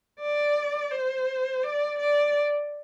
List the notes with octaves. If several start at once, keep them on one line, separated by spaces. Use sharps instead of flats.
D5
C5
D5
D5